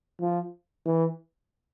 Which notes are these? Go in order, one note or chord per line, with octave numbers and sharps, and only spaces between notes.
F3
E3